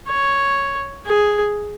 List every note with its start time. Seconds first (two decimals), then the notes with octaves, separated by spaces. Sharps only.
0.08 C#5
1.06 G#4